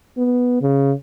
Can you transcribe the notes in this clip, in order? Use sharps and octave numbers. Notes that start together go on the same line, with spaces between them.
B3
C#3